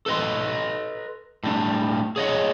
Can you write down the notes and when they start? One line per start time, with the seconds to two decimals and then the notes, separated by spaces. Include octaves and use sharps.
0.06 A4 B4 D#5 C6
1.44 A2 G3 D4
2.16 G#4 C#5 D#5 F#5